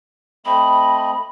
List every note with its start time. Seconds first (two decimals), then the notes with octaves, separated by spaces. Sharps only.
0.45 A3 C4 D#5 B5